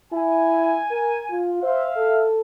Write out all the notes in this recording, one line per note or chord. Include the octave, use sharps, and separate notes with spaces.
E4 G#5
A#4
F4
C5 E5 F5
A4